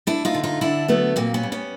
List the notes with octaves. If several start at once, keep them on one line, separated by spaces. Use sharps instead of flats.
A3 D4 E4
D#4 F4
D3
D#4 F4
D3 D4 E4
F#3 A3 B3
A#2 A#3 C4
B3 C#4
G3
B3 C#4